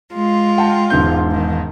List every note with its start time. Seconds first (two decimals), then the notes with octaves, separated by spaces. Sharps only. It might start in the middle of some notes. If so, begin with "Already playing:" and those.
0.12 G#3 F4
0.58 F#5 G5 A5
0.90 E1 G#2 G6
1.30 D#3